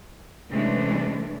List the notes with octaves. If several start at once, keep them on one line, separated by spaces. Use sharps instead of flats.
C3 E3 G#3 A3 C#4 D4